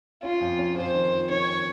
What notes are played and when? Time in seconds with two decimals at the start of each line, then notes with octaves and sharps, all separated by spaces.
0.23 C#4 F4
0.41 F2
0.59 C#4
0.77 F2 C5
0.95 D#3
1.12 F2
1.30 D#3 C#5
1.48 C#4